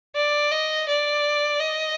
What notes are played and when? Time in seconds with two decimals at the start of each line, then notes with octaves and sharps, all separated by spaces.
0.16 D5
0.52 D#5
0.88 D5
1.60 D#5